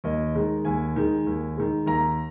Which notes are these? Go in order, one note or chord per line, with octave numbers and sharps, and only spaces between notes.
D#2 D#5
D#3 G#3
D#2 G#5
D#3 G#3
D#2
D#3 G#3
D#2 A#5